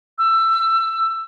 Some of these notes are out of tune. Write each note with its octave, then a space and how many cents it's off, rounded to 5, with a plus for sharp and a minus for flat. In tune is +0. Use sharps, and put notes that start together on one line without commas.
E6 +15